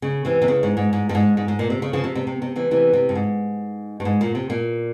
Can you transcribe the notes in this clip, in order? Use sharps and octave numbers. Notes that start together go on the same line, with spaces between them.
C#3
C3 E3
C3
C#3
G#2
G#2
G#2
G2
G#2
G#2
G#2
A#2
C3
C#3
C#3 F3
C3
C3
C3
C3
C3 E3
C3 E3
C3
G2
G#2
G2
G#2
A#2
C3
A#2